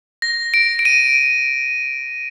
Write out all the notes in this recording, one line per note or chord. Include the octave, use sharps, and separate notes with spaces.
A#6
D7
D7
D#7